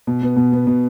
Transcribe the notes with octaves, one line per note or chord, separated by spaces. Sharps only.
B2
B3
B2
B3
B2